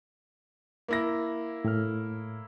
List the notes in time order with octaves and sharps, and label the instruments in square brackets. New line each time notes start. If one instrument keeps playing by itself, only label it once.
[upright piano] A#3 E4 A#6
[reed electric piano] A2 F6